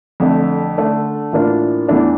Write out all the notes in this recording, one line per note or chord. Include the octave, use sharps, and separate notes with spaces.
F2 D3 A3
D3 A3 D4 A4
A2 E3 A#3 D4 F4
E2 E3 A3 D4